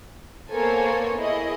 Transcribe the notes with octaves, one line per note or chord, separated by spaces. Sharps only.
A#3 B3 A4 C5 C#5 G#5
E4 G#4 D#5